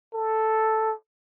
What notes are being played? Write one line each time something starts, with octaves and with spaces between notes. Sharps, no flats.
A4